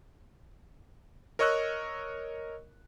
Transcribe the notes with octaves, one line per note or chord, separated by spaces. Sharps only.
A#4 C#5 D#5 C#6 E6 F#6